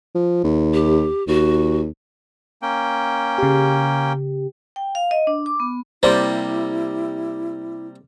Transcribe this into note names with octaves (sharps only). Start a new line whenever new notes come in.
F3
D#2
G4
D#2 F#4
A#3 C#4 G5
C#3 G4
G5
F5
D#5
D4
D6
B3
C3 G3 A#3 E4 C5 D5 D6